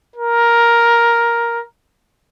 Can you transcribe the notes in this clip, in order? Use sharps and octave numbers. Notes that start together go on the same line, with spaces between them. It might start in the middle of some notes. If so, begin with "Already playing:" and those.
A#4